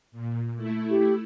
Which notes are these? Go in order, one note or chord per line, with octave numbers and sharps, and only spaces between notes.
A#2
A3 E4
G4